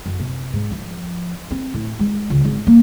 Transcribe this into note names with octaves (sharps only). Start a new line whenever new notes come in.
F#2
C3
G#2
F3
C4
A2
G#3
C#2
G#1
A#3